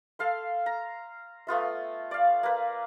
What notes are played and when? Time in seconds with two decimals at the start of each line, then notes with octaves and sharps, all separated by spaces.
0.19 A4 F5 C6
0.66 A#5
1.47 A3 B3 F4 E5
2.11 D5 F5
2.43 A#3 B4